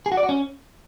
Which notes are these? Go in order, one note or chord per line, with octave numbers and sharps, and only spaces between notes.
G#4
F#4
D5
F#4
C#4